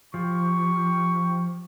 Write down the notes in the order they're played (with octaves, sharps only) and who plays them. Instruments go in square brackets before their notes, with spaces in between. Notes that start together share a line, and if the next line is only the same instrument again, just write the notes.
[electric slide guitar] F3 [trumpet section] G4 C#6